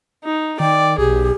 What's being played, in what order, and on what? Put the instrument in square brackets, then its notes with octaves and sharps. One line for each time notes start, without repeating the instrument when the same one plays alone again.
[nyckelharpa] D#4
[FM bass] D#3 [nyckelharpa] D5 [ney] G5
[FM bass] B1 [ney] G4 [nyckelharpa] G#4